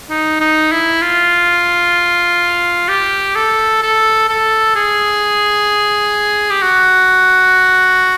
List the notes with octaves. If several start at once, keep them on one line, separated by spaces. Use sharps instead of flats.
D#4
D#4
E4
F4
G4
A4
A4
A4
G#4
G4
F#4